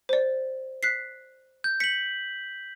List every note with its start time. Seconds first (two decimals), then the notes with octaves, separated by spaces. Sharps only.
0.09 C5 D5
0.83 F#6 B6 C7
1.64 G6
1.80 B6 C#7 F#7